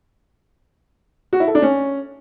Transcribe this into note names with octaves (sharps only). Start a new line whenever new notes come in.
F#4
E4
A4
D4
C#4